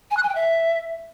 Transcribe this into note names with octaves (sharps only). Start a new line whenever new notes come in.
G#5
F#6
G#5
G5
E5